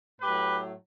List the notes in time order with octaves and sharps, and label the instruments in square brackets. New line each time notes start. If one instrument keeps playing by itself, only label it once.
[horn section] A2 F#3 G4 B4